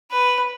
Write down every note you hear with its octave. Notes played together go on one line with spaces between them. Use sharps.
B4